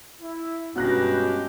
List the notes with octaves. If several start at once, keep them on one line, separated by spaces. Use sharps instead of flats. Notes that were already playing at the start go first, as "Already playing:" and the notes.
E4
G2 B2 G#3 C#4 G4 F#6 A#6